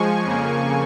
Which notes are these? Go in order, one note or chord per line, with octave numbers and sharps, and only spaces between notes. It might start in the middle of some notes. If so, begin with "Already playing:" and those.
Already playing: F3 G#3 G#5 C#6
F2 C#3 A#3